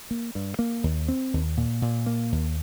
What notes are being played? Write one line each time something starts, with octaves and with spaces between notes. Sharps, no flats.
A#3
G2
A#3
D#2
C4
D#2
A#2
A#2
A#3
D#2